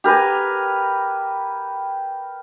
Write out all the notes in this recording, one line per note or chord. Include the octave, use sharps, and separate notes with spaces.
G4 A#4 B4 G#5